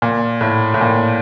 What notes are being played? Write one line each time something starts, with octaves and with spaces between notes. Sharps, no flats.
A#2
A2
A2
A#2